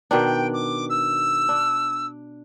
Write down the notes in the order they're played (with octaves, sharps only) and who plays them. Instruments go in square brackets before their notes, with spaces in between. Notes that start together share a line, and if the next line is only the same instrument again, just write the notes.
[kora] B2 D#3 D4 [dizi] G5
[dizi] D6
E6
[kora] D4